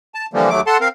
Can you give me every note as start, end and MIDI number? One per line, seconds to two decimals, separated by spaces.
0.15 0.26 81
0.33 0.50 50
0.33 0.50 52
0.33 0.50 53
0.33 0.50 55
0.33 0.50 58
0.50 0.61 39
0.50 0.61 54
0.50 0.61 57
0.50 0.61 86
0.67 0.77 69
0.67 0.77 78
0.67 0.77 81
0.67 0.77 84
0.81 0.88 60
0.81 0.88 70
0.81 0.88 77